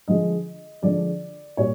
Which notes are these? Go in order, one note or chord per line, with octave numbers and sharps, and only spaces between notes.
D3 F3 G#3 D#5
D3 F3 G#3 D5
A#2 G3 C#5